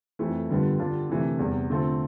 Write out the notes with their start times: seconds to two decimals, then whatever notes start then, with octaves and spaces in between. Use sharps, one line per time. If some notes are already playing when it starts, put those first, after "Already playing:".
0.19 F2 E3 A3
0.50 G2 D3 G3 B3 F4
0.79 D3 G3 D4 F4
1.09 C3 E3 A3
1.39 E2 C3 G3
1.69 D3 A3 C4 F4 A4